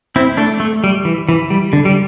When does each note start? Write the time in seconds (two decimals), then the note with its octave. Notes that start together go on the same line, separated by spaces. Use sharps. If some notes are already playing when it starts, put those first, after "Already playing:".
0.16 C4 E4
0.37 A3 D4
0.60 A3
0.84 G3
1.05 E3
1.29 E3
1.50 G3
1.73 D3
1.85 G3